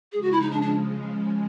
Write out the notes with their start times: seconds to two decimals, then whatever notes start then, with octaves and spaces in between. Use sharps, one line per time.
0.12 C#3 F3 G#3 G#4
0.22 F#4
0.32 E4
0.41 D#4
0.51 D4
0.62 D4